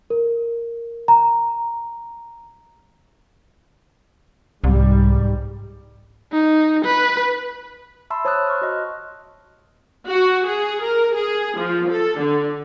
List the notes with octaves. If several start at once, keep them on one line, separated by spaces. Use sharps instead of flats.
A#4
A#5
C2 G#2 G3
D#4
B4
E5 A5 B5 C6 E6
C5 C#5 A5 D#6 E6 F#6
C6 C#6 F6 F#6
F#4 D#5
F#4
G#4
A#4
G#4
F3
A4
D3